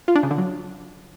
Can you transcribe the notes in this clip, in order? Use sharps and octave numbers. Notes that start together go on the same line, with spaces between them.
F4
D4
C#3
D3
F#3